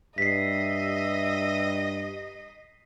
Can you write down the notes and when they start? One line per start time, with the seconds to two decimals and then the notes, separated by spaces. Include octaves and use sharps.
0.18 G2 D#5 E5 B6 C7